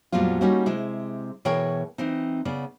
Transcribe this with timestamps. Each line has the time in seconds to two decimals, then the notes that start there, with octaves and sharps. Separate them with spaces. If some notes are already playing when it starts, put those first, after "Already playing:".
0.12 F2 A#2 F#3 G3 B3 F4
0.41 G3 A3 A#3 C#4 D#4 F#4
0.66 C3 G#3 E4
1.45 B2 E3 G#4 A#4 C#5 G5
1.98 E3 C4 D#4
2.45 C#3 B3 D5